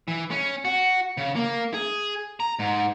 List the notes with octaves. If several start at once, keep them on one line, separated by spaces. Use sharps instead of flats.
E3
C#4
F#4
C#3
A#3
G#4
A#5
G#2